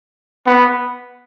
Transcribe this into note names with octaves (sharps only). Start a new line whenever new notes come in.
B3